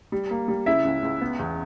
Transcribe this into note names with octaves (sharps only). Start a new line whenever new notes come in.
G3
A#3
G3
C#3 E4 E5
C#2
C#2
B3
E2